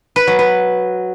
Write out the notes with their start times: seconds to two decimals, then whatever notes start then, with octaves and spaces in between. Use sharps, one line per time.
0.16 B4
0.27 F#3
0.39 B4